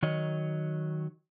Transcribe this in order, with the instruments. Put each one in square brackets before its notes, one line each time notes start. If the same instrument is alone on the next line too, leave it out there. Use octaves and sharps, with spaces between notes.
[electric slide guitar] D#3 F#3 C#5 D#5